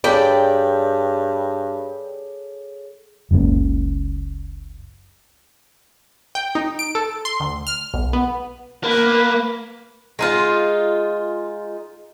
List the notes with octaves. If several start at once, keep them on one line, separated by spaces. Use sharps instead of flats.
G2 G#4 A4 C#5 D5 G5 B5
F#1 C#2 F#2 A#3
G5
D#4
D7
A4
C6
D2
F6
B1
B3
A#3 B4
G#3 D#4 F4